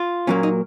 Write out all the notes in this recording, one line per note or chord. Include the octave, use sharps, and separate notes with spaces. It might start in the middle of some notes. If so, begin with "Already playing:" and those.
Already playing: F4
A#2 F#3 A#3 C#4
D#4